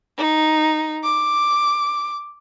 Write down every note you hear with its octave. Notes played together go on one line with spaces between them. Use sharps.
D#4
D6